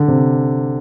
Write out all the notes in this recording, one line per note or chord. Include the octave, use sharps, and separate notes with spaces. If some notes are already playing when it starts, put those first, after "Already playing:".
Already playing: D3
C3